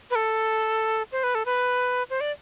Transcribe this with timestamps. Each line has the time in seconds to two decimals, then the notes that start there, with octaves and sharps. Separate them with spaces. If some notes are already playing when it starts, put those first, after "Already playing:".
0.11 B4
0.15 A4
1.12 C5
1.23 B4
1.35 A4
1.46 B4
2.10 C5
2.21 D5